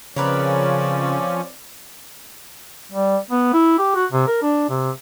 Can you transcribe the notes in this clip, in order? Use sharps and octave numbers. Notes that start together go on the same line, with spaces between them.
C#3 F3 C4 C#4 A#4 B4 C#5 D5
G3
B3
E4
G4
F#4
C3
A#4
D4
C3